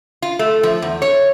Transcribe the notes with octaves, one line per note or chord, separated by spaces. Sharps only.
F4
A3
F3
E2
C#5